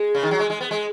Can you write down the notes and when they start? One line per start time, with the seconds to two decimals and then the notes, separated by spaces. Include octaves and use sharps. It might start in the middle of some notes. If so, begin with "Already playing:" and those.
Already playing: G#3
0.15 C#3
0.23 D#3
0.31 F#3
0.39 G#3
0.50 G#3
0.61 B3
0.71 G#3